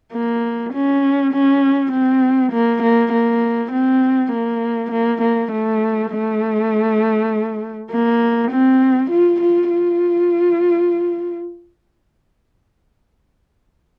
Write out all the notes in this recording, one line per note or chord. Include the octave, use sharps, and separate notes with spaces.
A#3
C#4
C#4
C4
A#3
A#3
A#3
C4
A#3
A#3
A#3
A3
A3
A#3
C4
F4
F4
F4